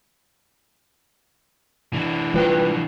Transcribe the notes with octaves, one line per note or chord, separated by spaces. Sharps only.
E3 D4
F3 G3 B4 G5